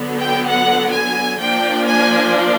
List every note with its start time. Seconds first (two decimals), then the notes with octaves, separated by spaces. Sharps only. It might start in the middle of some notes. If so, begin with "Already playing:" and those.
Already playing: D3 F#3 B3
0.17 G5
0.48 F#5
0.93 G#5
1.39 F3 A#3 D4 G5
1.86 G#5